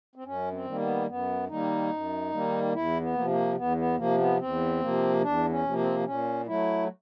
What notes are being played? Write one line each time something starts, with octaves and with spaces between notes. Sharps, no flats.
C4
F#2 C#4
C4
D#3 G3 A#3
B3
F#2 B3
D#3 G3 A#3 D#4
F#2
D#3 G3 A#3
E2 E4
B3
C3 F3 A#3
A#3
E2 B3
B3
C3 F3 A#3
B3
E2 C4
C3 F3 A#3
E2 D4
C#4
C3 F3 A#3
C4
C4
A#2 C#4
F#3 A3 E4